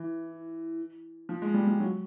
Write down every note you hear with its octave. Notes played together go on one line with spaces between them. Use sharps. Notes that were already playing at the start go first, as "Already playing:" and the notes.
Already playing: E3
F3
G#3
G3
G3
F#3